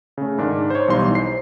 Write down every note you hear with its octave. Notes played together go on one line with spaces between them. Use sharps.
C#3 A3
G#2 D#3 D4
C5 C#5
B1 E3 G3 D#4 C6
C5 C7